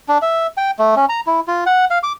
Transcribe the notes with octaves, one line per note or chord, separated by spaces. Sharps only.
D4
E5
G5
A3
C#4
A#5
E4
F4
F#5
F5
D6